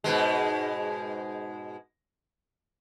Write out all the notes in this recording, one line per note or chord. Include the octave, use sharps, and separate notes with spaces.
G#2 B2 G#3